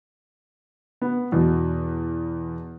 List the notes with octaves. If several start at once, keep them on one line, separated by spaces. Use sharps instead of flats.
B3
E2 B2